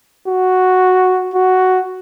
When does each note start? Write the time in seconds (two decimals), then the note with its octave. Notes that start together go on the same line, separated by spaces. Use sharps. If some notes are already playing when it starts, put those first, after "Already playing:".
0.27 F#4
1.34 F#4